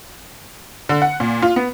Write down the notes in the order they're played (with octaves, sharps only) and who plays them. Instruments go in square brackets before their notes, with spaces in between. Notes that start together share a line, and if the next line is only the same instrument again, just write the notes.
[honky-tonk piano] D3
F#5
A#2
F4
B3